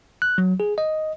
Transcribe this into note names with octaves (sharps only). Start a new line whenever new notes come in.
F#6
F#3
G#4
D#5